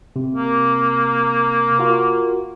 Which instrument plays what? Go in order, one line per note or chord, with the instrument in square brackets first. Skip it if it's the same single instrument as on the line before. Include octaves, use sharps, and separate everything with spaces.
[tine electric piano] C3
[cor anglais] A#3
[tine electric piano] F4 F#4 A#4